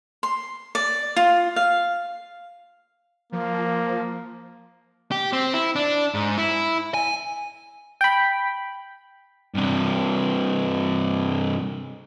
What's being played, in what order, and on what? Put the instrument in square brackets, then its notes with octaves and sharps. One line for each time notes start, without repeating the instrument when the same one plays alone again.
[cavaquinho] C6
D5
F4
F5
[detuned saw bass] F3 [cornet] A#3
[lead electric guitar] G4
C4
E4
D4
G#2
E4
G#5
[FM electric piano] G5 B5
[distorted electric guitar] G2 C3